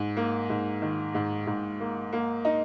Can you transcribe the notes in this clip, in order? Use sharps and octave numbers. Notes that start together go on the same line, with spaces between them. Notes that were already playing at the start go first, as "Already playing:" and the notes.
Already playing: G#2
A#3
G#2
D#3
G#2
G#2
A#3
A#3
D#4